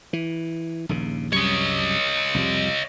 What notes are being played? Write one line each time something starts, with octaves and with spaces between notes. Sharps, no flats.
E3
A#1 D#2 C#3
C2 F#2 G3 C#5 D#5
C2 F2 G3